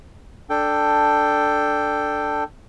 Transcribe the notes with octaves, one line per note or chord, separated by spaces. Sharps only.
D4 A4 G5